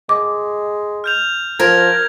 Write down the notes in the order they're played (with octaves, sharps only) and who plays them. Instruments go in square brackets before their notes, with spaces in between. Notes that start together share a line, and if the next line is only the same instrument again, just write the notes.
[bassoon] G#3 [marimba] D6
[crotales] F6 G6 F7
[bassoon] F3 [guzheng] A#4 [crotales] G#6 A#6 F7